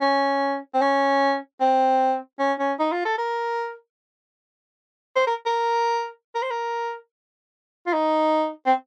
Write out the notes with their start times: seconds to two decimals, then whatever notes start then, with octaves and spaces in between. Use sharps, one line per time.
0.01 C#4
0.74 C4
0.81 C#4
1.60 C4
2.39 C#4
2.59 C#4
2.80 D#4
2.92 F4
3.05 A4
3.18 A#4
5.16 C5
5.27 A#4
5.46 A#4
6.35 A#4
6.42 C5
6.51 A#4
7.87 F4
7.93 D#4
8.66 C4